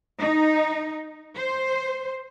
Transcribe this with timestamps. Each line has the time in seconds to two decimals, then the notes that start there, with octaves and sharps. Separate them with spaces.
0.19 D#4
1.37 C5